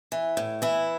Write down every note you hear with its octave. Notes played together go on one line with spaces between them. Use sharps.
E3
A2
E3 E4